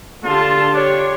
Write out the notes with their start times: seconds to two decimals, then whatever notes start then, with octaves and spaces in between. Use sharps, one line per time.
0.24 D3 F4 G4 A5
0.74 D4 G4 C#5